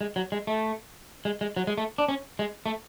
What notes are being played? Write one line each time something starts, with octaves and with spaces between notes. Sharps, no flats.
G#3
F#3
G#3
A3
G#3
G#3
F#3
G#3
A3
D4
C#4
G#3
A3